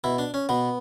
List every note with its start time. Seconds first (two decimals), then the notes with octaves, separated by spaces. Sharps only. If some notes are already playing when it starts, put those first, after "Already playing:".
0.04 B2 E4
0.18 D4
0.34 C#4
0.49 B2 B3